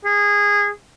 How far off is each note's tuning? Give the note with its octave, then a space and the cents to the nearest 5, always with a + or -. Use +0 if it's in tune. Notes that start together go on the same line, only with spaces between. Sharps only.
G#4 -20